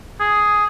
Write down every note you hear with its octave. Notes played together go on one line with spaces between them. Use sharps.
G#4